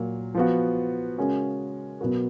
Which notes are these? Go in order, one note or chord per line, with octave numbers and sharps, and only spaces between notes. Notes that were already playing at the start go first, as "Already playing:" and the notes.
Already playing: A#2 F#3 A#3
F3 B3 F#4
C#3 G#3 C#4 F#4 A#4
B2 F#3 B3 F#4 A#4